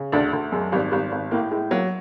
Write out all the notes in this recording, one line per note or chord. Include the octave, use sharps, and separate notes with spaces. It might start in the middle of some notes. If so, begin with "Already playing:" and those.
Already playing: C#3
D2 D4
D2
F#2 G#3
G#1 G3
G#1 G3
G#1
A2 A#3
A2 G#3
F#3 A#3